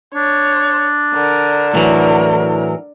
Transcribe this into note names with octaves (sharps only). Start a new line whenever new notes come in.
D4 C#5
D3 A#4
A2 E3 F#3 A#4